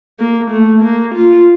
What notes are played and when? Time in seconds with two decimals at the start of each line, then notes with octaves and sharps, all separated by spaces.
0.19 A#3
0.50 A3
0.83 A#3
1.15 F4